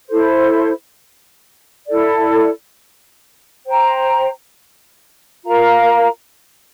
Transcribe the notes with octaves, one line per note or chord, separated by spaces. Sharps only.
E4 A4 C5
E4 A4 D5
C5 G5 A#5
F4 A#4 F5 A#5